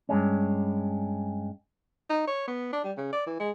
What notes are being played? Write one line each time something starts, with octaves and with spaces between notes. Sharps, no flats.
G2 G#3 C#4
D#4
C#5
B3
D4
G3
C#3
D5
E3
G#3